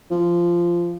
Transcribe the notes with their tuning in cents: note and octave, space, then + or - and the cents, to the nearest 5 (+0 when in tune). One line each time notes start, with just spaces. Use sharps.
F3 -15